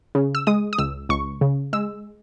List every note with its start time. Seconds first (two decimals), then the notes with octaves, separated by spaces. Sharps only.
0.15 C#3
0.35 E6
0.47 G#3 D#6
0.73 D#6
0.78 C#2 E6
1.09 C#2 C#6
1.41 C#3
1.73 G#3 E6